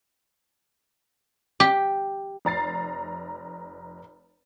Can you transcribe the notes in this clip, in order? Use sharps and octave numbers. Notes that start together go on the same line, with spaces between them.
G4
F1 A#5 A6 C7